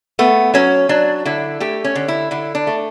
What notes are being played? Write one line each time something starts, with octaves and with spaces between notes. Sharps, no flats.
A3 B3
F#3 C#4
F#3 D4
D3 E4
A3 G4
C#4
D3
E4
D3 E4
D4
A3